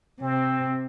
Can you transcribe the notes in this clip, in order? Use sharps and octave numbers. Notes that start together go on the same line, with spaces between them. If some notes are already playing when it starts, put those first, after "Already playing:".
C3 C4